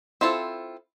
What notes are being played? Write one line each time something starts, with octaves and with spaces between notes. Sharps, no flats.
C4 E4 F4 A4